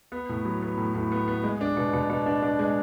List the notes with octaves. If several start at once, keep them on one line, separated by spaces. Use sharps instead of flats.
B3
A2
F#3
B3
A2
A2
B3
B3
G#3
D4
B2
B2
B2
D4
D4
G#3